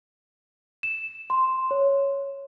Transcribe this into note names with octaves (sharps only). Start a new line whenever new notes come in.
E7
C6
C#5